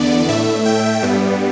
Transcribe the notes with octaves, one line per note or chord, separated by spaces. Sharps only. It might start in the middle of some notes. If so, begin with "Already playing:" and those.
Already playing: E2 D3 B3 D5
A2 A3 E5
G5
G2 G3 B3